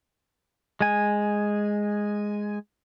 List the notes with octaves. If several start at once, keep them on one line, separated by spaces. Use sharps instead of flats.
G#3 G#5